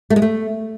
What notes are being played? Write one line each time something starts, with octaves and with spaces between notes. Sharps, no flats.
A3
G#3
A3